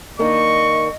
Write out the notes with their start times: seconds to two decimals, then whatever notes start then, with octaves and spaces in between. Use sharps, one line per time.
0.19 D#3 A#3 D4 D#5 C#6